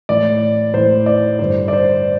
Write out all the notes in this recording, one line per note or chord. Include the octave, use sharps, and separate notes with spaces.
A2 E3 D5
A2 E3 C5
D5
G2 D3 C5
D5
C5